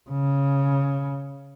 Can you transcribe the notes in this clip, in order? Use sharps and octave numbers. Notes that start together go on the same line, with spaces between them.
C#3